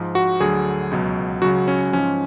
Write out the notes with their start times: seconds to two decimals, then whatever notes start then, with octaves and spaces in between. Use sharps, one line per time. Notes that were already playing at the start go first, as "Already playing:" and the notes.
Already playing: G#2 F3
0.15 F#4
0.40 D2 D3 F#3 G#4
0.91 C#2 B2 F#3
1.42 C#2 C#3 F#3 F#4
1.68 C#4
1.93 G#2 F3 C#4